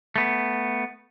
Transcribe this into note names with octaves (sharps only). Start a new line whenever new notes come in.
A3 B3